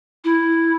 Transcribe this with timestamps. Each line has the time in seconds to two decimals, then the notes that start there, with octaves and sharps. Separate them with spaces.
0.24 E4